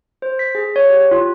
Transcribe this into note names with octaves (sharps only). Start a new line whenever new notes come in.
C5
B6
G#4
C#5
G4
F4